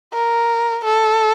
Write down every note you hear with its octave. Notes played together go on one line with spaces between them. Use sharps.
A#4
A4